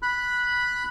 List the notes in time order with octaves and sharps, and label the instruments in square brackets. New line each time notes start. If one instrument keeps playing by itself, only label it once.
[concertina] B5 F#6